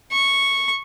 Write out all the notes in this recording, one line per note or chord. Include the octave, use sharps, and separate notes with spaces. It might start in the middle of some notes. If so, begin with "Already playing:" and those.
C#6